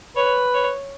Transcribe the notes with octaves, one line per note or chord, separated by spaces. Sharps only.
B4 C#5
C#5